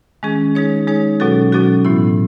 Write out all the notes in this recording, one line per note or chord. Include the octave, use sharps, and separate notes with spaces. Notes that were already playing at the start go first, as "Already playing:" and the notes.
D#3 G#3 C#4 G#4
G#3 D#4 G#4 C#5
G#3 D#4 G#4 C#5
B2 F#3 C#4 F#4 A4
B2 F#3 C#4 F#4 A4
A2 E3 B3 E4